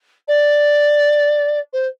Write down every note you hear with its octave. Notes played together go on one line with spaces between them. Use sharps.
D5
C5